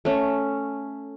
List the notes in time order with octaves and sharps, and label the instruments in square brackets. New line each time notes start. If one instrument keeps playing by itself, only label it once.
[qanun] A3 C#4